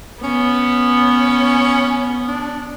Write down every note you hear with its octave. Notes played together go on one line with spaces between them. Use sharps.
B3 C#4
D4